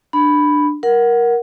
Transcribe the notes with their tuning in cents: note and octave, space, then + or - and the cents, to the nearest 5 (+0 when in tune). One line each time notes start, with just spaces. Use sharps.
D4 +15 B5 +5
A#4 +10 F#5 +0